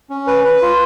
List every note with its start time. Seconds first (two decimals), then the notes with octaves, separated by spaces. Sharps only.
0.10 C#4
0.27 B4
0.45 B4
0.62 F4